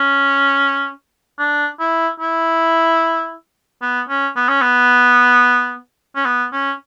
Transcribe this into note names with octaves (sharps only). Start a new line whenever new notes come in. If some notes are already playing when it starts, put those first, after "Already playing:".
Already playing: C#4
D4
E4
E4
B3
C#4
B3
C#4
B3
C#4
B3
C#4